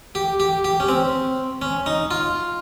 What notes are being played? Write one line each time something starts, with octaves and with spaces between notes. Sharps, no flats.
G4
G4
G4
C#4
C4
C#4
D#4
F4